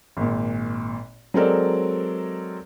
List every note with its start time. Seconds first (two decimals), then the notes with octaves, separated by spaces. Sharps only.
0.17 G#1 A#2
1.34 F#3 G#3 C4 A4 A#4 D5